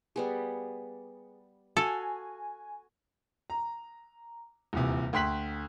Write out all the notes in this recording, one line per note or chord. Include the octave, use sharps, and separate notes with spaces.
G3 B3 G#4
F#4 A4 F5 G#5
A#5
D#1 E2 C3
D2 G5 C6 F#6 B6 F#7